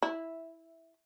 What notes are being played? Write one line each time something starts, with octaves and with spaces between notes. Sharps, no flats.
E4